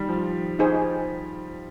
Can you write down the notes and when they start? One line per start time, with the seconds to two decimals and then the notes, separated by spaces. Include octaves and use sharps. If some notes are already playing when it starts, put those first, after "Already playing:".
Already playing: D#3 G3
0.09 F3
0.59 D#4 G#4 C5